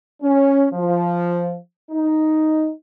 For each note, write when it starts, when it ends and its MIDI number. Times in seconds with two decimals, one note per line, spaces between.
0.23 0.67 61
0.73 1.56 53
1.91 2.69 63